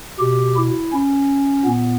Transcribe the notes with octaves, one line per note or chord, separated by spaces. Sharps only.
B2 G4
E4
C#4
A#2 B3